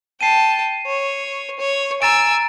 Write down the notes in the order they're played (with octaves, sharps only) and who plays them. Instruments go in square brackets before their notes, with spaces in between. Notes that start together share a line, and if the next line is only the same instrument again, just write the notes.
[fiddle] G5 A5 [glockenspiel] C7 D#7
[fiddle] C#5
C#5
[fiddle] G#5 E6 [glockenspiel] A#5 A6 D7